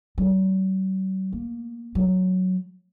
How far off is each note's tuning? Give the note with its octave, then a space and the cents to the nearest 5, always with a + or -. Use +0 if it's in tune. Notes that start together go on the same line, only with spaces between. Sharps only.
F#3 +45
A#3 +15
F#3 +0